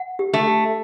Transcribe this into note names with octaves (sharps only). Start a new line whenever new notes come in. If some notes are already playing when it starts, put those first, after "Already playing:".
Already playing: F#5
G4
A3
G4